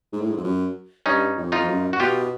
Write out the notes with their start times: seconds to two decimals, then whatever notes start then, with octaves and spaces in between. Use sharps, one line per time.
0.12 G#2
0.21 A2
0.30 G#2
0.37 F2
0.43 F#2
1.06 G2 C#4 D#4
1.37 F2
1.52 D#4 F4
1.60 F2
1.68 F#2
1.93 F#4
1.99 B2 F4 G4